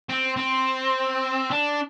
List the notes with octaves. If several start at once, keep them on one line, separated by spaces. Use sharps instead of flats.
C4
C4
D4